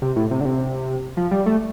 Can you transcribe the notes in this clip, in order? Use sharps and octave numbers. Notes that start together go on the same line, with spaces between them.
C3
A2
C3
D3
C3
F3
G3
A3